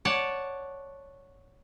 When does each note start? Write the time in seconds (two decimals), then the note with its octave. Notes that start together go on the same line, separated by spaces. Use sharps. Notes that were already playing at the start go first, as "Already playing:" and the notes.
0.05 C#5 D5 F#5 A5